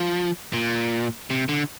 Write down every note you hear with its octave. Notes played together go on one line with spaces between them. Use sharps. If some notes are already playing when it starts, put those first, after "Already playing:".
Already playing: F3
A#2
C3
D3